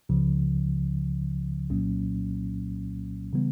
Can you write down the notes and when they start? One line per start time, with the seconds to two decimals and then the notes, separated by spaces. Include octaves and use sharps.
0.09 C#2 C#3 F3
1.70 C2 A#2 F#3 A#3 C#4
3.33 C#3 E3 G3 B3